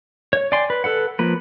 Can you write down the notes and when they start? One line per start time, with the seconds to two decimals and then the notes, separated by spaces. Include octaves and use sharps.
0.33 C#5
0.52 D5 G5 G#5 C6
0.70 B4
0.84 A4 B4 F#5
1.19 F3 A#3 B4